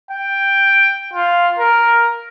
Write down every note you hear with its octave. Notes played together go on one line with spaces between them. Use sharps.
G5
F4
A#4